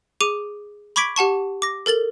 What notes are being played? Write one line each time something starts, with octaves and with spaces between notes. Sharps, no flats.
G#4 D6 D#7
B5 C#6 D6 G#6 B6 D7
G4 F#5 A5 C#6
D6 A#6
A4 A#4 A6 F#7